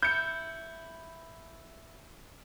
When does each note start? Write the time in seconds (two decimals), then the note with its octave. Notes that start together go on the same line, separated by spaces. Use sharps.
0.03 E4 G6 C#7